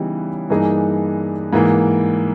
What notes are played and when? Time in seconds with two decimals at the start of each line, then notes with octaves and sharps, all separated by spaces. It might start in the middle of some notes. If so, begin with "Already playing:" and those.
Already playing: C#3 E3 G3 B3 D#4
0.50 G2 E3 A#3 D#4 G#4
1.53 G#2 E3 A#3